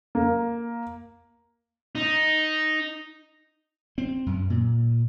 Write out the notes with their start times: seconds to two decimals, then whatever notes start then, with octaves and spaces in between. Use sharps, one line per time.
0.15 A#3
1.95 D#4
3.98 C4
4.26 F#2
4.50 A#2